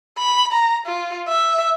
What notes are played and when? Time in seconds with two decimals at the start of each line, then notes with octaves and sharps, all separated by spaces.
0.19 B5
0.53 A#5
0.87 F4
1.28 E5